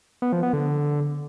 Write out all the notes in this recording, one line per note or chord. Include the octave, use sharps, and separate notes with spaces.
B3
F3
B3
D3